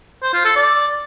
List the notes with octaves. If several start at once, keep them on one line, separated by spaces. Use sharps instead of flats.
C5
F4
A4
D5